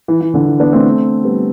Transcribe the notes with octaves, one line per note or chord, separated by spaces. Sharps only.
E3
E3
D3
E3
B3 D4
A3 C4
G3 B3